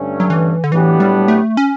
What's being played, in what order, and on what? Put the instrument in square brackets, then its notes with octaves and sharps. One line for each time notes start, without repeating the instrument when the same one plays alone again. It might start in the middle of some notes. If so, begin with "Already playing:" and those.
Already playing: [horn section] G2 D3 A3 C#4
[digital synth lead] F#3
E3
D3
[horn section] A2 F#3 B3 D4 G4 [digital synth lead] E3
[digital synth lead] G3
A3
C#4